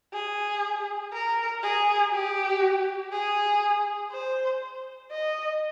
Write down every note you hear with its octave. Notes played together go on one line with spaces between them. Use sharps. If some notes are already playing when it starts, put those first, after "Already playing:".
G#4
A#4
G#4
G4
G#4
C5
D#5